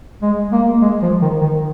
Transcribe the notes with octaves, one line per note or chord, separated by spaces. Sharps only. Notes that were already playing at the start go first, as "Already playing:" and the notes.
G#3
A#3
G#3
F3
D#3
D#3